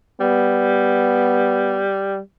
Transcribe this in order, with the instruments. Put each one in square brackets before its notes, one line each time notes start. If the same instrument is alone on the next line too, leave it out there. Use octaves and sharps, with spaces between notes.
[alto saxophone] G3 [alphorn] B3